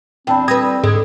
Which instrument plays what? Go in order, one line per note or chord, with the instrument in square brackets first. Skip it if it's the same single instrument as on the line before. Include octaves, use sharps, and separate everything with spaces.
[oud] E2 D4 [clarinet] C4 [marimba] G5 A5 B5
[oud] G3 B4 [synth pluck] D#6 G#6 A#6
[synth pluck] G#2 [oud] D3